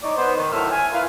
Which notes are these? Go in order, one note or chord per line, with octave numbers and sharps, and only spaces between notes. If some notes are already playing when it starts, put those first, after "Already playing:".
D#4 C#5 D5
B3 C5
D#3
A2 D3 F#3 A3 E5 F6
G#5
E4 F4 A#4 B4 F5